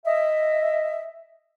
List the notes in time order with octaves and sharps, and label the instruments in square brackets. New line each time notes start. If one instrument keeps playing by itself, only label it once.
[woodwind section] D#5 E5